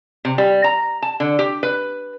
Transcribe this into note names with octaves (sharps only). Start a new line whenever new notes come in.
C3
G3
A#5
A5
D3
G4
B4